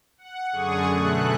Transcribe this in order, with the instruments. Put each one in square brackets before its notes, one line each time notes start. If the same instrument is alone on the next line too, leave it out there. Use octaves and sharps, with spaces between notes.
[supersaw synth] F#5
F#2 D3 G#4 C#6 D#6
B2 A3 F#6